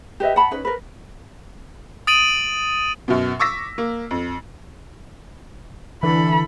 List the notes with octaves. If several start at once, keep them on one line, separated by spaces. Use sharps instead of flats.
G4 B4 D#5 E5
F#5 A5 B5
C#4 D#4 B4
A#4 B4
D#6 A6 D7 D#7 F#7
F#2 B2
C#6 D6 E6 A#6 B6
A#3
F2
D3 E3 A4 B5